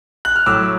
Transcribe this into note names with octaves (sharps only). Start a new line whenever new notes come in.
F#6
F6
A2 F#3 D6 E6